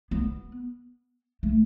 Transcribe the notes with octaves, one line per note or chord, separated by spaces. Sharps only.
B3
A3